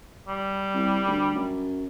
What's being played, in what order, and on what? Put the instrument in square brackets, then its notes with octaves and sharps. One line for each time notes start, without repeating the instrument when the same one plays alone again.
[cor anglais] G3
[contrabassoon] C2
D2
F#2